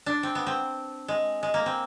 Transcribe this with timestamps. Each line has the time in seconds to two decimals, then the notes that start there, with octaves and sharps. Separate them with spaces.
0.06 D4
0.23 C4
0.35 B3
0.47 C4
1.08 G#3
1.43 G#3
1.54 A#3
1.66 C4